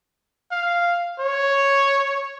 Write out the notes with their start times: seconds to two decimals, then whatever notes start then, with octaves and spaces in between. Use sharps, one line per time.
0.52 F5
1.20 C#5